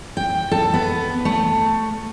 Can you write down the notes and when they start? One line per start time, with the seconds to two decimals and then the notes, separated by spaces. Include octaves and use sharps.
0.17 G5
0.51 A4
0.74 B3
1.25 A3